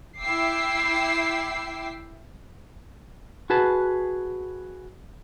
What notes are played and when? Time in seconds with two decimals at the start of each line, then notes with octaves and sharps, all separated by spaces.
0.21 E4 E5 G5 D6 E6 C7
3.50 F#4 G#4 B4 A5